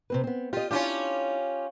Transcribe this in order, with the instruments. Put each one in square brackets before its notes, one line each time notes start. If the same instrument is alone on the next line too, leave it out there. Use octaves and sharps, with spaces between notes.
[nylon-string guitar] C3 C4 B4
B3 C4
[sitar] F4 [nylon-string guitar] G4 D#5
[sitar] C#4 F4 G4 [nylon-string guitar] D4 E4